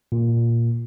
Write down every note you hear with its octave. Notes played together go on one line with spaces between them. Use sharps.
A#2